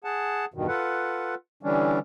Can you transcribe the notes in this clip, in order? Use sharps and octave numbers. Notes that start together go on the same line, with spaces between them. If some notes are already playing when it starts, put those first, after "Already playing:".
G#4 F#5 A5
E2 G2 B2 D#3
F4 A4 B4 F#5
D3 E3 G3 C#4 D4